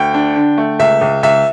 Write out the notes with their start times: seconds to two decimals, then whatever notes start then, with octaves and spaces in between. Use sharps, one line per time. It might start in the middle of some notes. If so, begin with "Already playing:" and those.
Already playing: D2 G5
0.14 D4
0.36 D3
0.58 A3
0.79 C#2 E5
1.01 C#2
1.23 C#2 E5